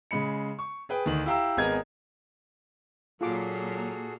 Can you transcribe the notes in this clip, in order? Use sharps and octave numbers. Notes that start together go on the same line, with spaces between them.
C#3 G#3 B5 C#7
C#6
G#4 B4 G5
D2 D#3 F#7
E4 G4 F5 G5 A#5 E6
G#1 B3 G#4 A#4 D#5 G#6
A#2 F#3 A#3 F4 F#4 G#4 A4 D6